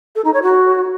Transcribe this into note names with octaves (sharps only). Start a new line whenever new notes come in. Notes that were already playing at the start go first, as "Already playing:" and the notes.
A4
D#4
C#5
F#4